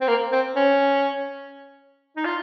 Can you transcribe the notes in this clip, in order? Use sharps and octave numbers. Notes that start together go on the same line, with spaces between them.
C4
A#3
C4
C#4
D#4
F4